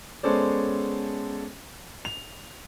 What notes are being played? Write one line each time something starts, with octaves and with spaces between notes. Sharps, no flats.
G#3 B3 C#4 A4 C5 D5
F7